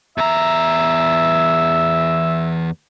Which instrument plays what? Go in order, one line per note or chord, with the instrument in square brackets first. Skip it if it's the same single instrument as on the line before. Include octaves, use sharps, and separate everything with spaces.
[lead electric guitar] E2 A#5 [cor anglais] E5